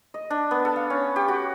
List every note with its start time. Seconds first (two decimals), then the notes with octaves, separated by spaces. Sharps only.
0.14 D#5
0.30 D4
0.51 B3
0.65 A4
0.76 F5
0.90 C#4
1.16 G4
1.28 F#4